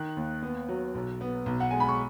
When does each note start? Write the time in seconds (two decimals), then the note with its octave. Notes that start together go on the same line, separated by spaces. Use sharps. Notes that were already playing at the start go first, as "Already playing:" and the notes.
Already playing: D#3 F#6
0.17 D#2
0.42 B3
0.68 F#3
0.95 B1
1.21 B3
1.46 B1
1.60 F#5
1.71 G#3 G#5
1.80 B5
1.89 C#6